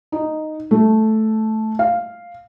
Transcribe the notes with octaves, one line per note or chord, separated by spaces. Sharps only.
D#4
A3
F5